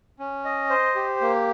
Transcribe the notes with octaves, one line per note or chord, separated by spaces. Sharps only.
C#4
D#5
C5
G4
A#3